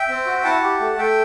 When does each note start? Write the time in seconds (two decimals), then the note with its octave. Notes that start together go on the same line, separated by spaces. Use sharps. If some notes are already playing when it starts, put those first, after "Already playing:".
Already playing: E5 G5
0.09 C4
0.26 F#4
0.44 E4 F#5 A5
0.62 G4
0.80 A3
0.98 A3 E5 G5